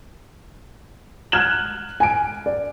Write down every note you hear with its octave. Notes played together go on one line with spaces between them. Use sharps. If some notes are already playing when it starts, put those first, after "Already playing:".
F6 F#6 G#6 E7 F#7
G#5 D7
D5